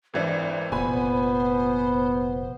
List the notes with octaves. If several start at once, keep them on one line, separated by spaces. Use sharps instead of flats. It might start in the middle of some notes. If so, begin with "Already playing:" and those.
G#1 E3 D4 C5
F1 A#2 B3 G#5 B5